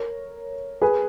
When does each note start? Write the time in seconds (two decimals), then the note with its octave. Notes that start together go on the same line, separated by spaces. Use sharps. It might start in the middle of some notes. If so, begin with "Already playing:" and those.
Already playing: A#4 C#5
0.82 G#4 B4